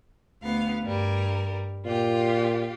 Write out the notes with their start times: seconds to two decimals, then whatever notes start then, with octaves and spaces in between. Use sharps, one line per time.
0.43 D2 B3 F5
0.85 G2 G3 A#4
1.85 A#2 F4 G4